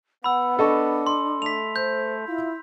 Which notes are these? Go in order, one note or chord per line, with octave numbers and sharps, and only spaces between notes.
B3 F#5 B5 E6
D4 A4 D#5 C#6
C6
A3 B6 F7
C5 G6
E4 F4